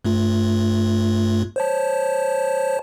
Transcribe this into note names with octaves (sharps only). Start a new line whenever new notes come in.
G2 A3 F4
C5 C#5 A5